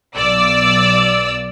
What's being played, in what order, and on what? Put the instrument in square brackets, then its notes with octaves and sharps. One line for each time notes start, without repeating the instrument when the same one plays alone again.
[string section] B1 D5 E6